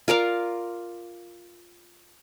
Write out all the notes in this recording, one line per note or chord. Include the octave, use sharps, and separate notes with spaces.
F4 A#4 D5 F5